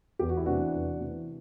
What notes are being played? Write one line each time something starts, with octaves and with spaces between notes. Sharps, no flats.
E2 G4
F#4
E4
C3 E3 D4 F#4
E2
C3 E3